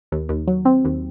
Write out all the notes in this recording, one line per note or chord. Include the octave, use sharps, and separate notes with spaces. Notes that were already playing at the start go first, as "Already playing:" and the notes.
D#2
D#2
F#3
C4
D#2